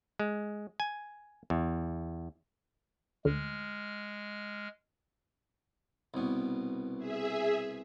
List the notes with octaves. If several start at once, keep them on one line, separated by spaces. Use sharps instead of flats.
G#3
G#5
E2
D2 G#3 F6
C2 B2
G#4 E5